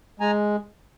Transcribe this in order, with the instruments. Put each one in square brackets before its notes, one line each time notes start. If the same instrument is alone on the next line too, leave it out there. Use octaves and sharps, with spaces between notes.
[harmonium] G#3 G#5 A#5